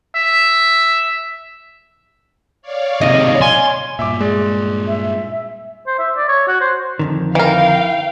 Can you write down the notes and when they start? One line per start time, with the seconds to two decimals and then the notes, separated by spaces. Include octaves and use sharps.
0.16 E5
2.62 C#5 D5 F5
3.01 C3 D#3 D#5
3.41 G#5 C6
3.99 G2 A#2 E5 D6
4.20 G#3 D5
4.87 E5
5.87 C5
5.99 E5
6.17 D5
6.28 C#5
6.48 F#4
6.61 C5
6.99 F2 D3 D#3
7.35 E3 A#4 F5 G5